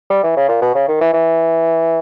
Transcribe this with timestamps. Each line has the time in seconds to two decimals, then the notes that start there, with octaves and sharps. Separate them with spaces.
0.10 G3
0.23 E3
0.37 C#3
0.48 A#2
0.61 B2
0.74 C#3
0.88 D#3
1.01 E3
1.13 E3